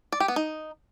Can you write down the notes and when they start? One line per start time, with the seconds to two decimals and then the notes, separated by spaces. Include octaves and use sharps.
0.12 D5
0.20 G4
0.28 B3
0.36 D#4